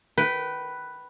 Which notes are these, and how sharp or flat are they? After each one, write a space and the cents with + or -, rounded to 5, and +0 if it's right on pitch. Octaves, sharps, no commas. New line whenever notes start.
B4 +0 G5 -30